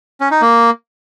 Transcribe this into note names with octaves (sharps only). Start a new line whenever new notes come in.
C#4
D#4
A#3